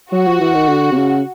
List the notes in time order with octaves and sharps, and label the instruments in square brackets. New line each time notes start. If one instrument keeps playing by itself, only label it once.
[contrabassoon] F#3 [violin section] F#4
[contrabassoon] F3
E3
D#3
D3
C3
C#3